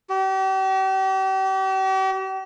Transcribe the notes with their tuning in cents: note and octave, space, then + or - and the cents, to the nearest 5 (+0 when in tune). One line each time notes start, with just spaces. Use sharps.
G4 -40